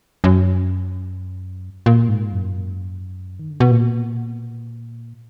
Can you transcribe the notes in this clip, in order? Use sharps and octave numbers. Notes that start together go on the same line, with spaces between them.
F#2
A#2
G#2
F#2
D#3
D3
B2
A#2